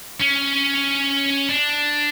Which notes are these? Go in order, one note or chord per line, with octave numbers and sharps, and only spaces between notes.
C#4
D4